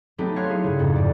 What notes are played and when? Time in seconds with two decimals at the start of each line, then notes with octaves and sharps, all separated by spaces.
0.18 F#3 A3 B3 C4 D#4 G4
0.36 C#5 F5 C6 F6 F#6
0.49 E4 G#4
0.64 G2 C#3
0.79 F2 G#2 G3
0.96 D5